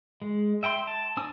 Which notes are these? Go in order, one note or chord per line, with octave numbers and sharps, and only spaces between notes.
G#3
E5 G5 A#5 C6
A5
C4 D4 G#5 D#6 E6